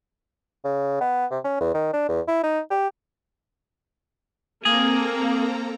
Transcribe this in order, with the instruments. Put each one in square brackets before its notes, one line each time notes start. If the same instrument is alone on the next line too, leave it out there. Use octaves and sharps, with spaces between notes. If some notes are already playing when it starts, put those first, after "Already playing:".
[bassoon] C#3
B3
C3
C#4
E2
D#3
D4
E2
E4
D#4
G4
[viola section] A#3 [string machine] C4 A4 A#5 [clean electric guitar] G#4